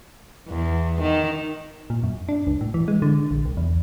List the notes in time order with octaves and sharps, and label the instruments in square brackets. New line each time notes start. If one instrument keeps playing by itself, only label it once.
[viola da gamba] E2
D#3
[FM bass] A#2
F#2
D4
C#2
A2
E3
G#3
D3
A#1
C2
E2